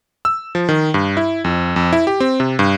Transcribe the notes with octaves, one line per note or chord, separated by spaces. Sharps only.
E6
F3
D#3
G2
E4
F2
F2
E4
G4
C4
C3
G2